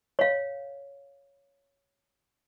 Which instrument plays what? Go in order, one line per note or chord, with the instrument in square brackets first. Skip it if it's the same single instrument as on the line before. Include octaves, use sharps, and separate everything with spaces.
[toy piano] C#5 F5